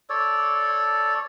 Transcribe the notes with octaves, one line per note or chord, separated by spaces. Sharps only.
A4 C#5 D5